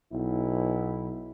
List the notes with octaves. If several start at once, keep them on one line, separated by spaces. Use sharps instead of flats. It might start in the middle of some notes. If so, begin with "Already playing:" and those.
B1 E4